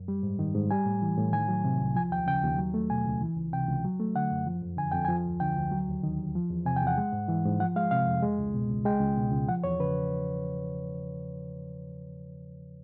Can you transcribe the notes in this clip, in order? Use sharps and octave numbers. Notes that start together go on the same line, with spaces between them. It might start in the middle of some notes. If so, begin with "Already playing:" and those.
Already playing: F#2
G3
G#2
D#3
G#2
G3 G#5
A2
E3
A2
D#3 G#5
F#3
C3
C2
F3 G#5
D#2 G5
C#3 G5
D#2
F#3
A3
B2 G#5
C#2
E3
C#2
C3 G5
C#2
F#3
A3
D3 F#5
F#2
F3
F2
D3 G#5
F2 G5
F3 G#5
D2
D3 G5
D2
F#3
D#2
D#3
D#2
F3
E2
C3 G#5
G5
E2 F#5
G#3
G#2
E3
G#2
F3 F#5
G#3 F5
C3 F5
F2
G#3
C#2
B2
C#2
G#3 G5
C#2
B2
C#2
F3 F#5
E2 C#5
C#3 B4